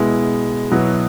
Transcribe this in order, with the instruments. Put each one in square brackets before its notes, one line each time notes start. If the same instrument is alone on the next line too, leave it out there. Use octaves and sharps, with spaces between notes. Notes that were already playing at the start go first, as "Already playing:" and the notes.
Already playing: [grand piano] B2 G#3 E4
B2 F#3 B3 E4